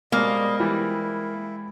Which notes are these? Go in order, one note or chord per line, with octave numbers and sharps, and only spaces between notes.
B2 G3 G#3 A#3 C4 D#5
E3 G3 E4